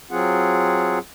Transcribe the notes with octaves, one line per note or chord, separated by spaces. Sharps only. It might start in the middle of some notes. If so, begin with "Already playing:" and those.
F#3 C4 F4 G#4 F#5